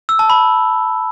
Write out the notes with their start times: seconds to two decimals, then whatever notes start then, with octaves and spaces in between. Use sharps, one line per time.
0.09 E6
0.19 A5
0.30 B5